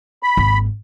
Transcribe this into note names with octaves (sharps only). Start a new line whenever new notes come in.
B5
G#1 D#2